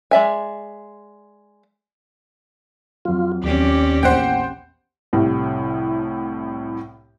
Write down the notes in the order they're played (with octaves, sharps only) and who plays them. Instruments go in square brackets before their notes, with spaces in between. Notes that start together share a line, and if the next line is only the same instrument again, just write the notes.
[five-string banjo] G#3 D5 E5 G#5
[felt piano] F2 F#3 [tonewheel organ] F4
[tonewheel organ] D#2 D5 [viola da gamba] C4 C#4 G4
[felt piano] A#1 E2 [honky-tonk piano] C5 F#5 G5
[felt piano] C2 A2 C3